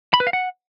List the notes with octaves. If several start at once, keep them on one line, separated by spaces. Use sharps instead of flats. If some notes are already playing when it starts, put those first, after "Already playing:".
B5
B4
F5
F#5